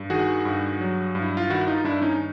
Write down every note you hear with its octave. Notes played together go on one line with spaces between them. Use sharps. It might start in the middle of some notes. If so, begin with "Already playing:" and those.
Already playing: G2
D#3 F#4 G#4
G2
F#3
G2
E4
F4
D#3 E4 F#4
D#4 F4
G2 D4 E4
C#4 D#4